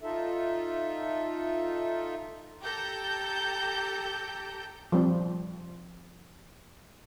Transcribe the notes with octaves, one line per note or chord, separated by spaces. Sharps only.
D#4 F4 A4 E5
G4 A4 A#5 G6
F3 G3 C4